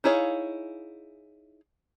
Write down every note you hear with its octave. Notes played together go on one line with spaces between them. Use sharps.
D#4 E4 G#4 C#5 F5